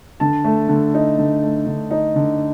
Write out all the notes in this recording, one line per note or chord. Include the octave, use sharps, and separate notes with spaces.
D3 A5
A3
D3
D#4
D3
A3
D3
D#4
D3